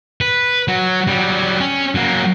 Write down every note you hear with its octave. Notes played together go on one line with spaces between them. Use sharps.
B4
F#3
F#3 G3
C#4
F#3 A#3